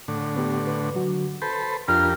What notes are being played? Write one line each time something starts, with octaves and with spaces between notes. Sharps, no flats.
A2 D3
B3 G4
B4
D3 F#3 F#4
A4 B4 C5 G6
F2 D4 F4 G4 A#4 F6